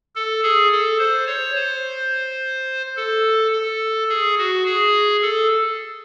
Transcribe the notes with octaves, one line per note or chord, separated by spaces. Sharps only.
A4
G#4
A4
C5
C#5
C5
A4
A4
G#4
F#4
G#4
A4